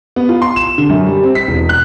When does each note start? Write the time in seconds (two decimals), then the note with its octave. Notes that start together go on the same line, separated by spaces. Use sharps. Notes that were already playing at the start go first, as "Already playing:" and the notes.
0.16 B3
0.29 F4
0.42 C6
0.56 E7
0.78 D3
0.89 F#2
1.06 G3
1.23 C4
1.35 B6
1.48 E1
1.69 F#6